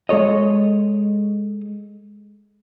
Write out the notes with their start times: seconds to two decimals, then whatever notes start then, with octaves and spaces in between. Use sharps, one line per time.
0.09 G#3 A4 C#5 D#5